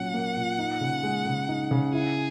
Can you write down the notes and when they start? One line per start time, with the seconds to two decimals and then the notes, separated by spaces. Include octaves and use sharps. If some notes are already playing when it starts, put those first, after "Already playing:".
Already playing: A#2 F#3 A#3 C#4 F#5
0.14 A#3
0.36 A#2
0.59 D#4
0.81 C#3
1.03 G#3
1.26 C#3
1.49 D#4
1.71 C#3
1.93 E4 G#4